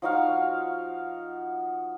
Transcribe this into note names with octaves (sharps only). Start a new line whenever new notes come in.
F3 D#4 F#4 F5